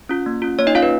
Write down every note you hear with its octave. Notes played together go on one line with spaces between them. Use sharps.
C#4 F4
A#3
C#4 F4
A#3 C#5
D#4 D#5
C#4 F4 F5
B4